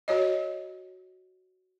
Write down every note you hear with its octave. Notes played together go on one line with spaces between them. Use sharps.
F#4 C#5 D#5